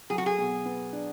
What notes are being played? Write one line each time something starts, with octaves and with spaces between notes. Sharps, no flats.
F#3 G#4
F#4
G#4
B2
B3
D4